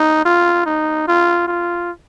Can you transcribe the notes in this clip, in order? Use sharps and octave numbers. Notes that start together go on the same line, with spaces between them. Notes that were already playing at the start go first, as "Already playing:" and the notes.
Already playing: D#4
F4
D#4
F4
F4